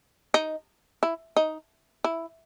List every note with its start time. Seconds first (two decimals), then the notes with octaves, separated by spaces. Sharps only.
0.34 D#4
1.03 E4
1.36 D#4
2.04 E4